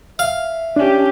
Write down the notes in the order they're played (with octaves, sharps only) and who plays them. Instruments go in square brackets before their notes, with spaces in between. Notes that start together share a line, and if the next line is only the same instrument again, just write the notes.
[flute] E5 [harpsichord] F5
[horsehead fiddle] C#4 G4 [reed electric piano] D4